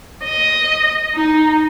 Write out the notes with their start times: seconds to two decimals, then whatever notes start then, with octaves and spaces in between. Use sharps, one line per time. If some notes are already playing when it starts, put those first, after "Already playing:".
0.24 D#5
1.15 D#4